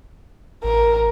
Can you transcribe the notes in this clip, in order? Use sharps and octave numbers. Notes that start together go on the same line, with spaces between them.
A1 A#4